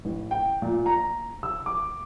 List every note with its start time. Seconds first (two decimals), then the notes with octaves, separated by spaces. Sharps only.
0.05 A1
0.31 G5
0.62 A#2
0.86 A#5
1.43 E6
1.66 D6